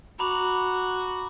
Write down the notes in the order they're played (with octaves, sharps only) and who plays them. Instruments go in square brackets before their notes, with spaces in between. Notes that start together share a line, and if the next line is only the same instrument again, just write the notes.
[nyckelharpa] F#4 [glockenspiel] A#5 B5 D6